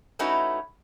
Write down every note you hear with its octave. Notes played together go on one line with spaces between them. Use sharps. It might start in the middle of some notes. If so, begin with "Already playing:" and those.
A3 C#4 D#4 E4 F#4 B4